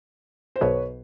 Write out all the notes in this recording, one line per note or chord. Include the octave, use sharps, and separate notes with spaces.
C5
B1 B2 F#3 B4 C#5